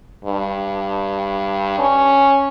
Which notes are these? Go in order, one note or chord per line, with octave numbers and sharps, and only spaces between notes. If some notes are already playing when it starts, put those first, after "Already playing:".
G2
C#4